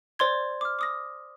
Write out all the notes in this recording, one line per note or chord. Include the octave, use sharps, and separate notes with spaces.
C5 D5 C6 G#6
D6 F6
D6 D#6 A#6